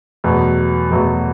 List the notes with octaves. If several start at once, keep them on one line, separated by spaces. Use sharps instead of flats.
E2 B2 F#3 A3
E2 B2 F#3 A3